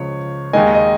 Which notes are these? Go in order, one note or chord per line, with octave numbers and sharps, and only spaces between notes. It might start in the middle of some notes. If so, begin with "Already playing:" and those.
Already playing: C#2 C#3 F3 C#5
D#2 D#3 G#3 D#5 G#5
D#5